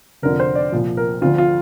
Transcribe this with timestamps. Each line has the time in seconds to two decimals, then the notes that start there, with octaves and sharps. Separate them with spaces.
0.22 F1 F2 D3 F3 A#4
0.40 C5
0.55 D5
0.72 C2 A#2 F3
0.97 A#4
1.21 D2 D3 F3 F4
1.38 F4